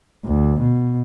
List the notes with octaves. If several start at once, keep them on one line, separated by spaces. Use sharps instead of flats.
D2
B2